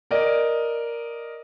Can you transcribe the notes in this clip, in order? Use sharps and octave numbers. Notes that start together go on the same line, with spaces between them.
A#4 D5 D#5